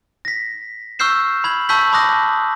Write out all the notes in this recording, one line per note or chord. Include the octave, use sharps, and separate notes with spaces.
A#6 B6
C#6 E6 F6 G6 C7 E7
B5 G#6 F#7
A5 C#6 E6 G6 B6 F#7
A5 B5 D6 D#6 F#6 A#6